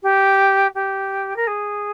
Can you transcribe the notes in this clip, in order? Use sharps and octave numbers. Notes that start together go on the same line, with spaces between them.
G4
G4
A#4
G#4